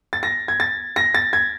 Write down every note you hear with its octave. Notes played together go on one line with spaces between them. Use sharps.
A6
A#6
G#6
A6
A#6
A6
G#6